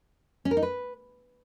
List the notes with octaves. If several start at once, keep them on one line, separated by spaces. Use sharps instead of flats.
C#4
A#4
D#4
B4